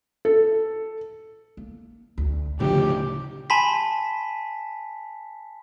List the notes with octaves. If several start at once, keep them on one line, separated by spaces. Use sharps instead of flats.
A4
A#3
D2
D1 D2 C#3 F3 G4
G#5 A5 B5 C6 B6